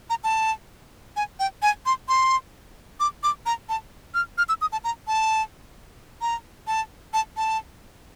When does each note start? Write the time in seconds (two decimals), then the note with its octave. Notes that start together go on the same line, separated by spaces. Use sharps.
0.10 A#5
0.24 A5
1.16 G#5
1.39 G5
1.62 G#5
1.86 C6
2.09 C6
3.00 D6
3.23 D6
3.46 A#5
3.69 A5
4.14 F6
4.38 F6
4.49 E6
4.61 D#6
4.72 A5
4.84 A#5
5.07 A5
6.21 A#5
6.67 A5
7.13 A5
7.37 A5